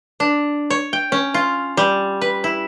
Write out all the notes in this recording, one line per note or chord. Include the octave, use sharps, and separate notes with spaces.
D4
C#5
G5
C#4
F4
G3
B4
E4